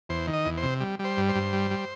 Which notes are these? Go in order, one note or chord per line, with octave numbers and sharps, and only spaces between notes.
E2 C5
D#3
D#5
E2
C5
C3
G3
G3
C5
G2
C5
G2
G3
G3